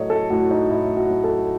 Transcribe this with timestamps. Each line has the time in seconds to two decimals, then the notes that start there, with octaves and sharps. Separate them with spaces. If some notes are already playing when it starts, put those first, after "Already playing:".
Already playing: A2 F#3 A3 C#5 D#5
0.10 A4
0.30 A2 F#4
0.51 D#4
0.70 A2 E4
0.97 F#4
1.10 F#3
1.24 A4